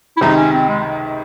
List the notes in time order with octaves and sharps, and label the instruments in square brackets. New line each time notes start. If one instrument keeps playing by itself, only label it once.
[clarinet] E4
[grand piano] C#2 C3 D#3 [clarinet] D#4
[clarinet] C#4
C4
G#3